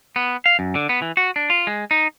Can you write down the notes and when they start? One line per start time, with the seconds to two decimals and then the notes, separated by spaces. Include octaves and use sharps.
0.16 B3
0.46 F5
0.59 F#2
0.75 D3
0.89 B3
1.02 E3
1.17 F#4
1.36 D4
1.50 F4
1.67 G#3
1.91 D#4